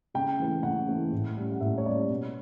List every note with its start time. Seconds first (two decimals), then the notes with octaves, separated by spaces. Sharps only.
0.14 C#3 G5
0.39 E3 A3
0.63 C#3 F#5
0.88 E3 A3
1.12 A2
1.37 G3 C#4
1.52 F#5
1.60 A2 E5
1.78 C#5
1.86 G3 C#4 D5
2.09 B2